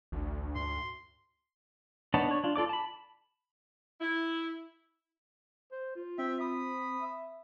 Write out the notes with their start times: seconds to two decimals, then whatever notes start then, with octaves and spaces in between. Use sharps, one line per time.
0.12 A1 D2
0.55 G#2 C6
2.14 B3 D4 D#4 C#5 A5
2.28 D4 C#5
2.44 D4 F4
2.56 F4 A4 D5 D6
2.69 A5 B5
4.01 E4
5.72 C5
5.96 F4
6.18 C4 E5 G5
6.41 B5 D#6
7.00 E5